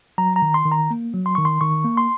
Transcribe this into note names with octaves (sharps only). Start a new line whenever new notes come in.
F#3 A#5
A#5
D#3
C6
D#3
A#5
A#3
F#3
C6
D#3 C#6
C6
D#3 C#6
A#3
C6